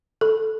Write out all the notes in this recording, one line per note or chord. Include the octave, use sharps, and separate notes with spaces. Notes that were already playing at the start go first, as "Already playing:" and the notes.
A4